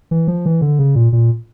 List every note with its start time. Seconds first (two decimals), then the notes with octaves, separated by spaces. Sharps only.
0.11 E3
0.28 F3
0.46 E3
0.61 D3
0.79 C#3
0.95 A#2
1.12 A#2